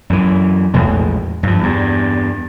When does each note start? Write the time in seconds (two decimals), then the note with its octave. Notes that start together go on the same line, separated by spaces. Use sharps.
0.10 F#2 E3
0.74 A#1 E2 A2 G#3
1.43 G2 F3
1.59 E2 G2